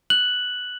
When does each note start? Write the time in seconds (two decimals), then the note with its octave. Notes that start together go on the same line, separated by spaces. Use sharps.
0.10 F#6 F#7